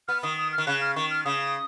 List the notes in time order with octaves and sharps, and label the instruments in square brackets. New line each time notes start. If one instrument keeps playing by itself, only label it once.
[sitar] B3 [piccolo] F6
[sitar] D#3 [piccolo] D#6
[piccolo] D#6
F6
[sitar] D#3
[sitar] C#3 [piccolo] F#6
[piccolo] F6
[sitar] D#3 [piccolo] C#6
[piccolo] F6
[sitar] C#3 [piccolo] D#6